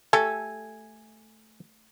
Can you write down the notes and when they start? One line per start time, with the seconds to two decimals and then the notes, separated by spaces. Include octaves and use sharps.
0.13 A3 G4 A4 G#5